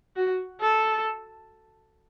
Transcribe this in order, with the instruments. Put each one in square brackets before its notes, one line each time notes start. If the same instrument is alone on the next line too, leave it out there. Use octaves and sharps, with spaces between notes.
[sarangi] F#4
A4